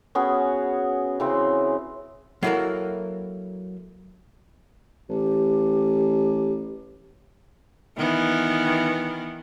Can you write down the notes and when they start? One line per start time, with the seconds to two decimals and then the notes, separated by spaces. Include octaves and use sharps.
0.15 B3 C#4 F#4 G#4
1.20 C#3 E3 C4
2.43 F#3 A#3 E4 F#4 A4 A#4
5.10 A1 G4
7.97 D#3 E3 B3